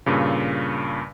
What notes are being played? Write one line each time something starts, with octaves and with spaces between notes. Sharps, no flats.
G2 A#2 C#3